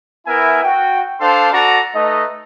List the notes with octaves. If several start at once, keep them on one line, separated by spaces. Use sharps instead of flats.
B3 E4 A#4 E5 G#5
F#4 G5
D4 A4 C5 F5 C6
F#4 A4 D5 A#5
A3 D#4 B4 D#5